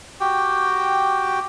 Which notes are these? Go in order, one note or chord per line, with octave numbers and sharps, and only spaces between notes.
F#4 G4 G5